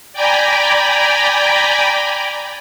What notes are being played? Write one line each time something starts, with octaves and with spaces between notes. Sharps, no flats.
D5 G5 G#5 A#5 B5